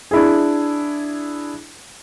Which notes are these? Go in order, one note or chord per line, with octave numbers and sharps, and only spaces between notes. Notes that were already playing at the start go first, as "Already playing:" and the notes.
D4 E4 G#4